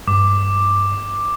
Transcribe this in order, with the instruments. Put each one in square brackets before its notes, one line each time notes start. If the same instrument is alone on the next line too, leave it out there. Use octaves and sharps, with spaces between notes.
[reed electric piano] G2 [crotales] D6